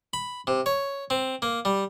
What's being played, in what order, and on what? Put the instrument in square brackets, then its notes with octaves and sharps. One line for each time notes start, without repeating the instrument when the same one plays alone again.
[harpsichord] B5
C3
C#5
C4
A#3
G3